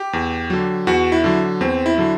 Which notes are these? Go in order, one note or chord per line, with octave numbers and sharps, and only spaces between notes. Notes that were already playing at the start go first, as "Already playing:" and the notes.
Already playing: G4
E2
D3 F#3
E2 F#4
E4
D3 F#3
E2 C4
E4
D3 F#3